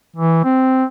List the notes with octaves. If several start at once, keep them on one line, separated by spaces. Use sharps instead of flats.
E3
C4